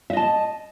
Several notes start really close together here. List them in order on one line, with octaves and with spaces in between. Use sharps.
E5 D#5 A5